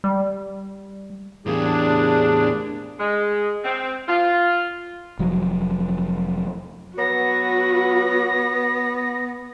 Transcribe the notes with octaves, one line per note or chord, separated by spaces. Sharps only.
G3
E2 A2 A#3 D4 G4 G#4
G#3
C4
F4
F1 F3 F#3
F#3 B3 F#4 B4 A#6